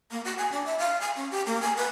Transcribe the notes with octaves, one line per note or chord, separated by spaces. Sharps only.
A#3
F#4
G#5
D4
E5
F5
G#5
C#4
G4
A#3
G#5
B4